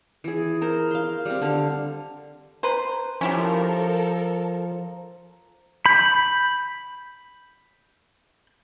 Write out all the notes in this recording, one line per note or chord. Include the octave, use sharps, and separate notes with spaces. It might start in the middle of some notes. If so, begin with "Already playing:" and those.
E3 G#4
A#4 C5
F5 C6
G3 C4
D3 F5
B4 C5 A#5
F3 C#4 E4 G4 A4 A#4
B5 G6